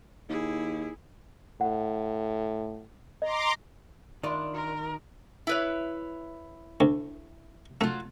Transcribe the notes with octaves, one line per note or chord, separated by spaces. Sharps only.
D#2 E4 G#4
A2 F#5
D#5 A#5 C6 D6
D#3 D4 F4 D5 E5 B5 C6
F#4 A#4
E4 B4 C#5
D2
F#3 A3 F4